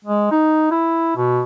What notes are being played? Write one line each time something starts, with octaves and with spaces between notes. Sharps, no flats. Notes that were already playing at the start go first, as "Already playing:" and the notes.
G#3
D#4
E4
B2